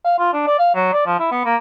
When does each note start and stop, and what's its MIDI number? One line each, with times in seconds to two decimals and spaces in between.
0.05 0.18 77
0.19 0.33 65
0.33 0.42 62
0.47 0.59 74
0.59 0.72 77
0.75 0.88 54
0.93 1.06 74
1.07 1.18 53
1.20 1.27 64
1.32 1.43 59
1.45 1.56 58